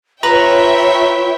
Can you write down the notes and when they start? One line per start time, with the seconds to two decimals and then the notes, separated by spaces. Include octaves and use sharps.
0.23 F4 B4 C#5 E5 G5 A#5